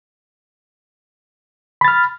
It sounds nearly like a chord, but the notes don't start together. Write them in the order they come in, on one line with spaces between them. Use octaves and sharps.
B5 A6 F6